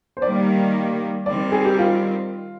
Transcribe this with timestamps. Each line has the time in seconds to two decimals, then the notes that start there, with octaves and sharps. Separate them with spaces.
0.17 C5
0.22 D#3 G3 A#3 D5
1.26 D#3 G3 C4 D5
1.52 G#4
1.65 G4
1.79 F4